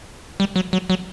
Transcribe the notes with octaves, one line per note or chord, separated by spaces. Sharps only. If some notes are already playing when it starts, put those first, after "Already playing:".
G3
F#3
F#3
F#3